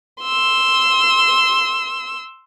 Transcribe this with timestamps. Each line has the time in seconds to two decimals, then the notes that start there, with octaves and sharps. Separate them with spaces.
0.23 C6 E6